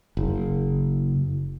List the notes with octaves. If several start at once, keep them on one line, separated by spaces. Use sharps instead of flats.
F#1